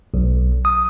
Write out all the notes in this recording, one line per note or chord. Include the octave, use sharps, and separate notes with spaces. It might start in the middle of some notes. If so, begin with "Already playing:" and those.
B1
D#6